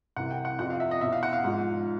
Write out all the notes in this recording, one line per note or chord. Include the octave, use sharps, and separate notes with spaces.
C2 C3 E3 F#5
G5
F#5
F2 C3 F3 F#5
F5
E5
D#5
E2 B2 E5
F5
F#5
F5
G#2 F3